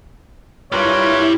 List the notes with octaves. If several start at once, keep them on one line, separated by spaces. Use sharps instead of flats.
G2 G3 E4 F4 A#4 B4 C#5